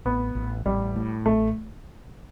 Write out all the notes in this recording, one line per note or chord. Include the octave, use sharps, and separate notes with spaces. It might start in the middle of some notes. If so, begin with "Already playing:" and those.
A1 B3
A1
A1 G3
A2
A1 A3